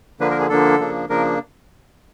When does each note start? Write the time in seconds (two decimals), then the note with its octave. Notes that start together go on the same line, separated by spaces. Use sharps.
0.20 D3 F3 A#3 D4 B4
0.30 A#4
0.40 G#4
0.49 D3 F3 A#3 D4 A4
0.79 C#3 F3 A#3 D4
1.09 C#3 F3 A#3 D4 A#4